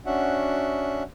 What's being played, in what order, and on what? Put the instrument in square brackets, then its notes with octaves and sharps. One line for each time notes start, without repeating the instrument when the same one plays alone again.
[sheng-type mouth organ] C#4 D4 F#4 E5 F#5